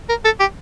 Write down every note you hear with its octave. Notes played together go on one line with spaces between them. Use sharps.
A#4
A4
G4